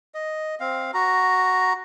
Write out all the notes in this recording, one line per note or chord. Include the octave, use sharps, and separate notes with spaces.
D#5
C4 F5
F#4 A#5